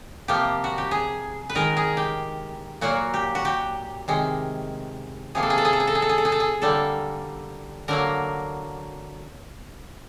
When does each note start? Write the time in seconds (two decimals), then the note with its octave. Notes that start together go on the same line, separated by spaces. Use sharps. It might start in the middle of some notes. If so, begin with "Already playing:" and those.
0.28 C3 F3 A#3 G4
0.64 F#4
0.78 G4
0.91 G#4
1.49 B4
1.55 D#3 G#3 A#4
1.77 G#4
1.97 G4
2.81 A#2 F#3 A#3 F#4
3.14 G4
3.35 F#4
3.45 G4
4.08 C3 D#3 G#3
5.35 C3 F3 A#3 G#4
5.43 A4
5.50 G#4
5.58 A4
5.65 G#4
5.73 A4
5.80 G#4
5.87 A4
5.95 G#4
6.02 A4
6.09 G#4
6.18 A4
6.25 G#4
6.32 A4
6.40 G#4
6.62 D3 G3 A#3 A4
7.88 D3 F#3 A#3 A#4